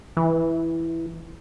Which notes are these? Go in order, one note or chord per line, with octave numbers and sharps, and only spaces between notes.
E3